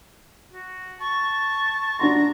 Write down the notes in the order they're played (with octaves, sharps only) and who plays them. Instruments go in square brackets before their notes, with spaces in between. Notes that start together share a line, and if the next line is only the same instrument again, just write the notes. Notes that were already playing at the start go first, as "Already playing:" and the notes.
[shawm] F#4
[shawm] A5 [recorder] C#6
[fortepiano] D4 F#4 C6 [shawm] A#5